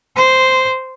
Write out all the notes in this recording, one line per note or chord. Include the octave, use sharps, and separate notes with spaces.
C5